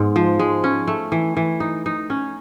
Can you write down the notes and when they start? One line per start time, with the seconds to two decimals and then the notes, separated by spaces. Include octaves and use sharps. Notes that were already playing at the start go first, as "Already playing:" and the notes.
Already playing: G#2 G#3 B3
0.16 F3
0.39 G#3
0.64 C#4
0.87 A3
1.12 E3
1.37 E3
1.60 D#4
1.86 D#4
2.10 C#4